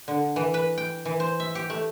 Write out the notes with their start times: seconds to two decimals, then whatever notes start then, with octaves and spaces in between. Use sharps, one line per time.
0.08 D3
0.36 E3
0.54 B4
0.78 G5
1.05 E3
1.20 C5
1.40 E5
1.55 G4
1.70 A3